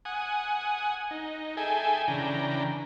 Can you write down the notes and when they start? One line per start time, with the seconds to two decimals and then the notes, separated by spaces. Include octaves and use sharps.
0.05 F#5 G#5 D#6
1.11 D#4
1.57 G#4 A4 E5 G5 G#5
2.08 C#3 E3 D4 G5 A#5